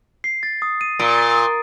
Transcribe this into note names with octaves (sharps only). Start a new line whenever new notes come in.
C7
A6
D#6
D#7
A#2 D7
A6
D#6